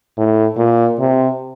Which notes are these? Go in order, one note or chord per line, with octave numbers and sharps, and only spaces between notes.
A2
A#2
C3